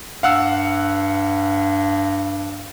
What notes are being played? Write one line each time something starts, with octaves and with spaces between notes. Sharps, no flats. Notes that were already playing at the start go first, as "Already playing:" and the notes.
G2 F5 F#5 E6